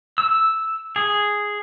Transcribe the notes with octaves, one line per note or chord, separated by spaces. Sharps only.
E6
G#4